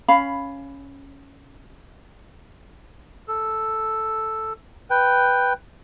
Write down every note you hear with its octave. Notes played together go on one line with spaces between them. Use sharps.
C#4 F5 B5
A4
B4 G5